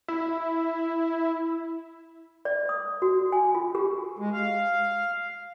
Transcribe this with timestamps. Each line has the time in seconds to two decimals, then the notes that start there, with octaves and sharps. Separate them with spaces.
0.08 E4
2.45 D5
2.69 D#6
3.02 F#4
3.32 G#5
3.55 F4
3.75 G4
4.19 G#3
4.33 F5